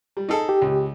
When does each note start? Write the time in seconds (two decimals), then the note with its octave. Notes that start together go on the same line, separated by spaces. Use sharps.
0.17 G3
0.29 D#4 G#4 A4
0.49 G4
0.62 C#2